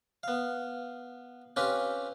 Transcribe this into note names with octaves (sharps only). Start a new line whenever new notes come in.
B3 F5
C4 C#4 F4 G4 B4